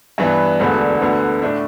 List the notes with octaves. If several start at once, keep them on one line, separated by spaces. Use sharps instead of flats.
G2 E3 B3
E1 D2 D3 B3
D2 D3 B3
A2 A3 D4